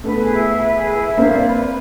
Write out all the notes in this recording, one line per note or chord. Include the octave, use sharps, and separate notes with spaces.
A3 B3 B4
G#4
E4
E5
B4
G#4
E4
E5
A#3 C4 F5
D5
B4
B4